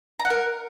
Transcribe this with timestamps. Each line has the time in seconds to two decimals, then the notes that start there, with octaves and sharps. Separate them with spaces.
0.20 A#5
0.25 F#5
0.30 A#4